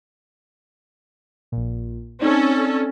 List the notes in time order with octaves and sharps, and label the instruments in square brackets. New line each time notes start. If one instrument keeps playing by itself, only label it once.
[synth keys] A#1 A#2
[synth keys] C4 D#4 D5 [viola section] C#4 A4